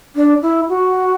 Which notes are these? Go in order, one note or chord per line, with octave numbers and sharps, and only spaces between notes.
D4
E4
F#4